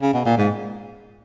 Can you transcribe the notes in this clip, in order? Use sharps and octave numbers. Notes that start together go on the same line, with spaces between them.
C#3
B2
A#2
G#2